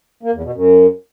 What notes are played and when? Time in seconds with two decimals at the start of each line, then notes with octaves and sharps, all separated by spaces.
0.23 A#3
0.33 E2
0.44 B2
0.54 F#2